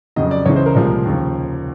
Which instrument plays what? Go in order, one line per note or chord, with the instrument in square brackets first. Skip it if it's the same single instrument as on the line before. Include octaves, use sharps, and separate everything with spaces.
[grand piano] F2 C#3 F#3 D#5
D5
C#2 C#3 E3 G#3 C#5
C5
A#4
C2 A#2 F3 G#3
D#2 C#3 F3